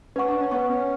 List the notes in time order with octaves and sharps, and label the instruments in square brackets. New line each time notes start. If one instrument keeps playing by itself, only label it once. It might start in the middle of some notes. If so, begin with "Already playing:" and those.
[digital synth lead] C#4 [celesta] B4 F#5 C#6
[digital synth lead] D4
C#4
[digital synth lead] B3 [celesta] B4 F#5 C#6
[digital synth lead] C#4